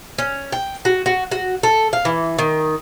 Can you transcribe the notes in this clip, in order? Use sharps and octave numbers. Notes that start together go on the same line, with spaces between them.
C#4
G5
F#4
F#4
F#4
A4
F5
E3
D#3